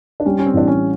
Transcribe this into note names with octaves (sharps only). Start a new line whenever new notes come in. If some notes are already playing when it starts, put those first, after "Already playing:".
D4
G3 C#4
C#4
C4
A1 D4
C#4